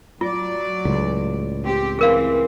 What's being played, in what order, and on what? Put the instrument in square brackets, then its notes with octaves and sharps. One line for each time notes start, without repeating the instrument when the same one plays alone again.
[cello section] F#3 D5 [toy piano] F4
[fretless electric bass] C#2 A2
[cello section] C4 G4
[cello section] E3 C4 [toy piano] G#4 A#4 F5